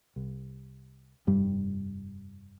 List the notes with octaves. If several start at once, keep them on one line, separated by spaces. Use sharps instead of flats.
C2
F1 G2 G3